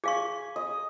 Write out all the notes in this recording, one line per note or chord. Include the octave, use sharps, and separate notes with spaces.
G#4 F5 G#5 C#6
D#5